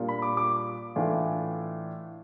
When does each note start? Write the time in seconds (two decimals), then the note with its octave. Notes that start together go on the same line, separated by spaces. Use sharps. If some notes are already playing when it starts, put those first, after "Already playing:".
Already playing: A#2 G3 A#3 D4 F4
0.09 B5
0.22 D6
0.37 D6
0.96 A2 E3 A3 D4 F4